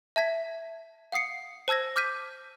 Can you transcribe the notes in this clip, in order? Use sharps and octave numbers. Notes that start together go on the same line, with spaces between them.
E5 A5 G#6 B6
F5 F#5 D#6 C7 C#7
C5 A5 E6 G#6 A#6
D6 F6 G6 B6 D#7